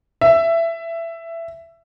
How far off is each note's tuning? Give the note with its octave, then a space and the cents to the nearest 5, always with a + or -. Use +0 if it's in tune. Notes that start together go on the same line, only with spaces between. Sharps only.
E5 +15